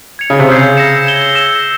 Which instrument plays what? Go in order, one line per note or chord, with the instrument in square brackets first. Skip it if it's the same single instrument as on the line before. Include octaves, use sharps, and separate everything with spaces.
[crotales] G#6 C#7 F7
[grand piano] C#3
C3
[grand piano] C#3 [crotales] E6 G6 C7
[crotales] E6 A#6 C#7 E7
G#6 E7 G7
E6 A#6 E7 G7